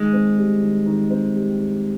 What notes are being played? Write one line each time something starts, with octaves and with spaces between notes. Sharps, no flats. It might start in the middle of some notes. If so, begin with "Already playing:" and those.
Already playing: D#3 G#3
C4
G3
D#3
D#3
C4
G3
D#3